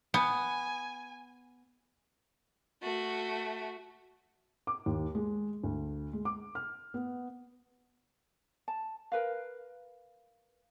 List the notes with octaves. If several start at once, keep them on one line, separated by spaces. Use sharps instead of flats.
B3 G#5
A3 F#4
D6
D#2
G#3
D2
G#3
D6
F6
B3
A5
A#4 B4 F5